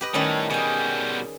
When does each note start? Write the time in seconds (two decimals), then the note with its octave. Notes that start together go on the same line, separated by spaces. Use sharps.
0.01 G4 B4 D#5
0.14 A2 D#3 G3 C#4
0.50 B2 G3 G#4 G#5